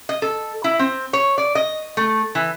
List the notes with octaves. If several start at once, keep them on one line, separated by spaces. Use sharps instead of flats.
D#5
A4
E4
C4
C#5
D5
D#5
A3
E3